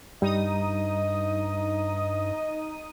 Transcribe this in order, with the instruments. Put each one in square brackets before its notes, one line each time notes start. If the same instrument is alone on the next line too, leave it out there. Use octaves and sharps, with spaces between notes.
[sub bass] G2 [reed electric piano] G3 [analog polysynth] D#4 D#6 [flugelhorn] D#5